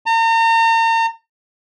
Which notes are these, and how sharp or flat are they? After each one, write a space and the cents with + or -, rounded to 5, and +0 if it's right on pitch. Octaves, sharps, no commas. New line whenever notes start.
A#5 -40